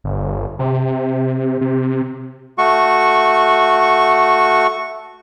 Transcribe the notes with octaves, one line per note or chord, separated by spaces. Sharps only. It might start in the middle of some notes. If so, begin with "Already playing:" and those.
G1
C3
C3
A3 F#4 C#6